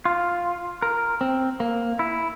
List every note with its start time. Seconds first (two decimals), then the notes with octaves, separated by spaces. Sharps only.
0.05 F4
0.82 A#4
1.21 C4
1.60 A#3
1.99 E4